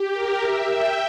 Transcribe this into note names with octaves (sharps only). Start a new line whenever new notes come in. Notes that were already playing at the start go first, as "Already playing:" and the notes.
Already playing: G4
A#4
E5
G5